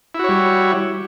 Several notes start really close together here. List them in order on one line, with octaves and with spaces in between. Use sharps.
E4 F#4 C#5 G3